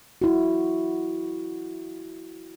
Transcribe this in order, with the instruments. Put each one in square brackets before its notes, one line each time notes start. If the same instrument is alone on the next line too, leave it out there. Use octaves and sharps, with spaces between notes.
[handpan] E4 F#4